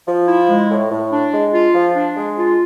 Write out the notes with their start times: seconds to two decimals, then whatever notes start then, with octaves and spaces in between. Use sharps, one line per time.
0.08 F3
0.28 E4
0.50 G#3
0.70 A2
0.92 A2
1.12 D4
1.33 G#3
1.54 F4
1.74 F3
1.96 D4
2.17 G#3
2.38 F4